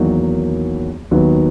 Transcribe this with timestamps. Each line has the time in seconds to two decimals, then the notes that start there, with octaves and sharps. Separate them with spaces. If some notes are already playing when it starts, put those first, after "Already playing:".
Already playing: E2 D#3 F#3 A#3 D#4
1.11 D#2 D#3 F#3 B3